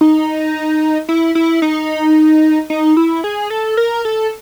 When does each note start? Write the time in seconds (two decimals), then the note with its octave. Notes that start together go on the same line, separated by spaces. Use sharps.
0.01 D#4
1.09 E4
1.35 E4
1.62 D#4
2.70 D#4
2.97 E4
3.24 G#4
3.50 A4
3.77 A#4
4.05 A4